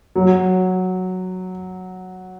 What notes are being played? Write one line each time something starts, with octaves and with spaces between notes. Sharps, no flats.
F#3